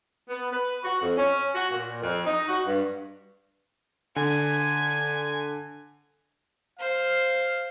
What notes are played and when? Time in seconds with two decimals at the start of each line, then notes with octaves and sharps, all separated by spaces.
0.29 B3
0.52 B4
0.84 F#4
1.02 F2
1.17 C#4
1.54 F#4
1.72 A#2
2.03 F2
2.26 D#4
2.48 F#4
2.67 G2
4.16 D3 G#5
6.79 C5 F5